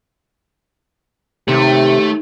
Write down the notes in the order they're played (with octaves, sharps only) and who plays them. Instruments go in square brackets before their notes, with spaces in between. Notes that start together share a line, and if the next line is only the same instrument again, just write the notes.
[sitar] D#2 [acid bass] C3 [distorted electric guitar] A3 [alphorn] G4